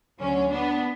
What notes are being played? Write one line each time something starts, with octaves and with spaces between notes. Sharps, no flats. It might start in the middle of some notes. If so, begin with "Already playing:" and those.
D2 D3 F#3 C#4
B3 D4